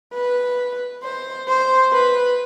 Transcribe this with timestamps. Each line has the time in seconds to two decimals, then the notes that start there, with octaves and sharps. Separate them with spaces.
0.14 B4
1.03 C5
1.48 C5
1.93 B4